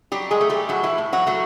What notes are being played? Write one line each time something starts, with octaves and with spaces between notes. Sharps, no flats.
F#3 G3 G4
G#3 G#4
A3
G3 G4
A2 F#3 F#4
E3 E4
A2
F#3 F#4
F#3 A3 F#4